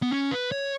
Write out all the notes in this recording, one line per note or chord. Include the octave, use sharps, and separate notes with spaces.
B3
C#4
B4
C#5